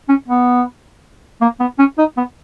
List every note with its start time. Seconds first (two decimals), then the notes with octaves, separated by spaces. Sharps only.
0.09 C#4
0.28 B3
1.42 A#3
1.60 B3
1.79 C#4
1.98 D#4
2.17 B3